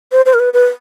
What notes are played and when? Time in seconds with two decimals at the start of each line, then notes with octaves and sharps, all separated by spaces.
0.12 C5
0.26 C5
0.34 A#4
0.39 B4
0.53 B4